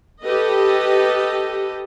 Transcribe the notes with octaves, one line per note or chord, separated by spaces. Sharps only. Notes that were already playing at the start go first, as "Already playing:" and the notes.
G4 A4 B4 D#5